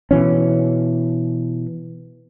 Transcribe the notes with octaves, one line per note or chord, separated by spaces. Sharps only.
B2 E3 C#4